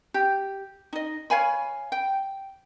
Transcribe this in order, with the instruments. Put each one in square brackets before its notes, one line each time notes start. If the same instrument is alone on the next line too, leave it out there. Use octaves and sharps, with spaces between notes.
[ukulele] G4
D#4 D#5
C#5 F5 G#5 B5
G5